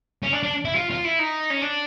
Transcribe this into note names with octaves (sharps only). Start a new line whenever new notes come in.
C#4
D4
D4
E4
F4
F4
E4
D#4
C#4
D4